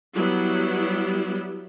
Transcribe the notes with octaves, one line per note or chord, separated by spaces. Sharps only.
F#3 G3 B3 E4